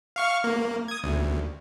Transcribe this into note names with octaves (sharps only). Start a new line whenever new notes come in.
F5 C#6 F6
A#3
D#6 G#6
D2